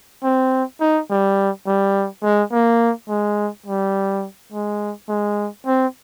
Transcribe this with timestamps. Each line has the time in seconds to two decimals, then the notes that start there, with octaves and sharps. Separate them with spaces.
0.23 C4
0.80 D#4
1.10 G3
1.67 G3
2.23 G#3
2.52 A#3
3.09 G#3
3.66 G3
4.52 G#3
5.09 G#3
5.66 C4